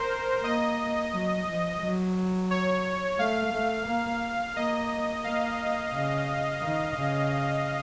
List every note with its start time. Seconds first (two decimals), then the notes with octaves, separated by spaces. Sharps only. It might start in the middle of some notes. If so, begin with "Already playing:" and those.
Already playing: A#4 C5
0.44 A#3 D#5
1.13 F#3
1.48 F3
1.82 F#3
2.51 C#5
3.18 A3 F5
3.53 A3
3.87 A#3
4.55 A#3 D#5
5.24 A#3 F5
5.92 C#3
6.61 D#3
6.96 C#3